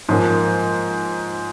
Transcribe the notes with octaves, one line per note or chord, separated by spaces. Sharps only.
G#2 F3 A#3